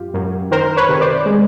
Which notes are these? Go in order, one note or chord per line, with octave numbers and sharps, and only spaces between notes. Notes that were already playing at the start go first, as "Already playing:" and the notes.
Already playing: F#2 F4 G4
F#2
D#3 A#4 C5
B4 C#5
C3
C5 D5
G#3